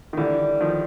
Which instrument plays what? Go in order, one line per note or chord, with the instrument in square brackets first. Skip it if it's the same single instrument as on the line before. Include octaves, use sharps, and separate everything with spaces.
[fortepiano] D#3
[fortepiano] D3 E3 [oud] G3
[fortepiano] D#3 F3